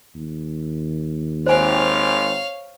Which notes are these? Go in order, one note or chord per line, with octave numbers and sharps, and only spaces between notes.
D#2
G#1 C5 C#5 F5 G#5